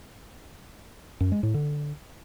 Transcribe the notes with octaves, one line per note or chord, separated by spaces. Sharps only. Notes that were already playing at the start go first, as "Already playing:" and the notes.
F#2
G#3
A2
D3